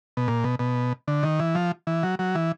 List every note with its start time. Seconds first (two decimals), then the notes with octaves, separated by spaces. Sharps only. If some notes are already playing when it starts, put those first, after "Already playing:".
0.17 B2
0.28 A#2
0.44 B2
0.59 B2
1.08 D3
1.23 D#3
1.39 E3
1.55 F3
1.87 E3
2.03 F#3
2.19 F#3
2.35 E3